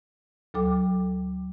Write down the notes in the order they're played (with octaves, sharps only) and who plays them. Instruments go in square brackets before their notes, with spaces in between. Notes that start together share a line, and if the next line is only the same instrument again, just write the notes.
[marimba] D2 F#3 A4 G5 D6